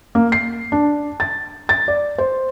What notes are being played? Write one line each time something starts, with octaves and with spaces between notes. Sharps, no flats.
A#3
C7
D4
A6
A6
D5
C5